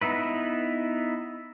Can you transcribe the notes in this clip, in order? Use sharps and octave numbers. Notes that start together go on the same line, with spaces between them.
B3 D#4 E4 B4